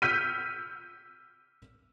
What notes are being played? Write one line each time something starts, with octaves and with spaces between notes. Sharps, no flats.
E6 F6 G6 B6 C#7 D#7